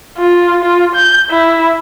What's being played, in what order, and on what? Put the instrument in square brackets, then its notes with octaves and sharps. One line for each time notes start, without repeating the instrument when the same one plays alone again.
[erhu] F4
F4
G6
E4